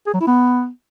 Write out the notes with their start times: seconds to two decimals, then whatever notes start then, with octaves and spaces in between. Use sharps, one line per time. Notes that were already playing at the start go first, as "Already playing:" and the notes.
0.07 G#4
0.14 F#3
0.20 E4
0.27 B3